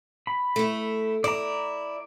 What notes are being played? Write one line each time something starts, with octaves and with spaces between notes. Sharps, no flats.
B5
A3 E4
E4 D5 A#5